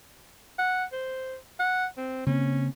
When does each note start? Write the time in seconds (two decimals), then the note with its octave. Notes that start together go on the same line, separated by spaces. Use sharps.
0.58 F#5
0.92 C5
1.60 F#5
1.98 C4
2.27 C#3 A#3 C4 C#4